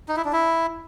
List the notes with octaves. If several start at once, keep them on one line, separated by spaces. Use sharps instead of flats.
D#4
E4
D4
E4